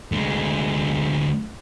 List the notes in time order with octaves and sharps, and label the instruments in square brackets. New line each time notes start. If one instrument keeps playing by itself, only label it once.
[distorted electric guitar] D2 G#3